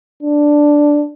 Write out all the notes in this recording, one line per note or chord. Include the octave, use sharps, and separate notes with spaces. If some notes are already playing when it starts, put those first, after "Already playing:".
D4